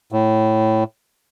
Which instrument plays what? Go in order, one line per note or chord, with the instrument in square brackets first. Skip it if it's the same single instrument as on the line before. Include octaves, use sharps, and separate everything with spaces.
[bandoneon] A2